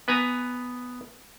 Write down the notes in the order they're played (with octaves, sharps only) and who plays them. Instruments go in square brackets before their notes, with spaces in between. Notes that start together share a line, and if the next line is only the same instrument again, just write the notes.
[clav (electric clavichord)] B3 B4 G#5 A#5